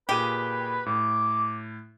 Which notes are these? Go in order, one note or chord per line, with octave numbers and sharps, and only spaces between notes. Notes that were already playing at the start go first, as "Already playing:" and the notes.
A#2 G4 G#4 B4 D#7
A2 D6